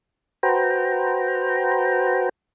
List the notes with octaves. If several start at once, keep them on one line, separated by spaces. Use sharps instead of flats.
F#4 B4 C5 G5 A#5